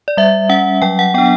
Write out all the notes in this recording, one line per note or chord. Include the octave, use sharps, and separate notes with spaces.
D5
G3 E5
C#4 F#5
F#3 G5
F#5
B3 D4 G5